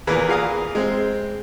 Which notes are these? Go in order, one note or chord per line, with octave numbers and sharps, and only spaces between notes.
E2 A#2 E3 A#3 G#4 B4
F4 G#4 F5 A#5 D#6
G#3 C4